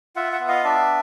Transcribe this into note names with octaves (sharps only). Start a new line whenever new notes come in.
F4 E5 F#5
E5 F#5
B3
D#5 F5
D4 D5 E5